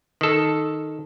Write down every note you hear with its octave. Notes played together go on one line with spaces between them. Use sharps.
D#3 A4